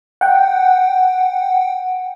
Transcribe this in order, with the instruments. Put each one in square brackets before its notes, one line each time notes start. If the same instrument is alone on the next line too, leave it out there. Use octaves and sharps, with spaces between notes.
[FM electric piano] F#5 G5